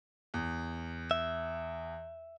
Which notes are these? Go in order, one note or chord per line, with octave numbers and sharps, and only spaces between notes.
E2
E5